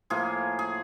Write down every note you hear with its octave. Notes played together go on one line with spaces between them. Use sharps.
A2 F3 A#3 G#4
G#4